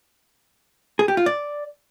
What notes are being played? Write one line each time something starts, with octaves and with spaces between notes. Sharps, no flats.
G#4
G4
F4
D5